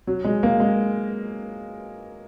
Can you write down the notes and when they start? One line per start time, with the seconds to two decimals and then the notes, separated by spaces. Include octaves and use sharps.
0.07 F#3
0.24 G#3
0.43 A#3
0.60 G#3